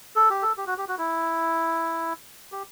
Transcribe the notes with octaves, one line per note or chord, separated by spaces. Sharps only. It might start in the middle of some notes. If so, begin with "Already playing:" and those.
A4
G4
A4
G4
F#4
G4
F#4
E4
G4